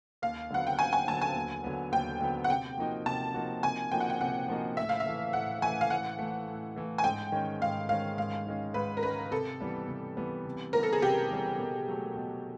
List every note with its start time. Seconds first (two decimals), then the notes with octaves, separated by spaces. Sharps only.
0.22 D#2 F5
0.50 D3 F#3 B3 F#5
0.67 G5
0.79 D#2 G#5
0.93 G#5
1.08 D3 F#3 B3 A5
1.21 G#5
1.35 D#2
1.64 D3 F#3 B3
1.92 D#2 G5
2.21 D3 F#3 B3
2.44 F#5
2.50 C3 G5
2.78 F3 A#3 D#4 F#4
3.06 C3 A5
3.34 F3 A#3 D#4 F#4
3.63 C3 G#5
3.92 F3 A#3 D#4 F#4 G5
4.00 F#5
4.10 G5
4.21 C3 F#5
4.48 F3 A#3 D#4 F#4
4.77 A2 E5
4.89 F5
5.00 E5
5.06 E3 A3
5.33 A2 F#5
5.62 E3 A3 G#5
5.81 F5
5.90 A2 F#5
6.19 E3 A3
6.48 A2
6.76 E3 A3
6.98 G#5
7.04 G#2 G5
7.32 D#3 G#3 C#4
7.61 G#2 F5
7.89 D#3 G#3 C#4 F5
8.18 G#2 F5
8.47 D#3 G#3 C#4
8.74 G#2 B4
8.97 A#4
9.03 D#3 G#3 C#4 B4
9.31 C3 A4
9.60 E3 G3 B3
9.88 C3
10.17 E3 G3 B3
10.45 C3
10.73 E3 G3 B3 A#4
10.83 A4
10.93 G#4
11.02 C3 G4
11.31 E3 G3 B3
11.59 B2
11.88 F#3 A3
12.16 B2